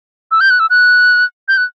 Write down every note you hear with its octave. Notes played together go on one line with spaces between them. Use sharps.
E6
G6
F#6
E6
F#6
G6
F#6